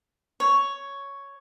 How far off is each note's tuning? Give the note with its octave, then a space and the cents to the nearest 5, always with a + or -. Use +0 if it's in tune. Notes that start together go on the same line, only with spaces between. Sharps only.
C#5 +5